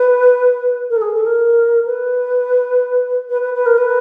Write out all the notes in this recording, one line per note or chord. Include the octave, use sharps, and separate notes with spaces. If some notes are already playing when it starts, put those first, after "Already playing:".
Already playing: B4
A#4
A4
G#4
A4
A#4
B4
B4
B4
B4
A#4
B4